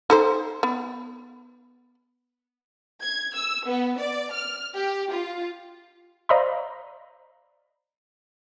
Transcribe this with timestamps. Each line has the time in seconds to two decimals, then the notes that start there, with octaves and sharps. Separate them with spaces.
0.10 D#4 A4 C5
0.63 B3
3.03 G#6
3.35 E6
3.66 B3
3.98 D5
4.32 F6
4.76 G4
5.11 F4
6.29 C5 D5 D#5 F5 A#5 B5